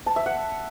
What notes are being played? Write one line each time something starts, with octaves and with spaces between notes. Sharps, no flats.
A5
E5
F#5